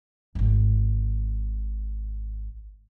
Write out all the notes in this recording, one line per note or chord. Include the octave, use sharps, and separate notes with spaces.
D#1 G#1